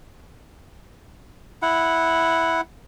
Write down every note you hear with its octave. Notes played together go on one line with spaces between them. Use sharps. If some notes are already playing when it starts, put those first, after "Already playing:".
E4 F#5